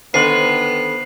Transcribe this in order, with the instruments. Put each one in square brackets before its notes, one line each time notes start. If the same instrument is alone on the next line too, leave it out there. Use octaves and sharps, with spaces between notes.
[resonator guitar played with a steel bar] D3 D#3 A4 [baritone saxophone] B3 [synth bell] C5 [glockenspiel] C7 F#7